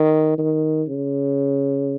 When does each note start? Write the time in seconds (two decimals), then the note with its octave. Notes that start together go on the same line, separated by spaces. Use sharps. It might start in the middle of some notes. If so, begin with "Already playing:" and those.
Already playing: D#3
0.38 D#3
0.89 C#3